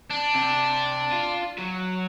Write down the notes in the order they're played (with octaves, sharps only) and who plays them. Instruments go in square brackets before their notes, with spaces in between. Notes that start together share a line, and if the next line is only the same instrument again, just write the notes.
[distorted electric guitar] D4
[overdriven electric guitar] C3
F4
F#3